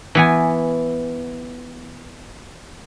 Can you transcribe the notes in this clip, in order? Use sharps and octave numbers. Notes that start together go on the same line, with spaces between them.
E3 B3 G#5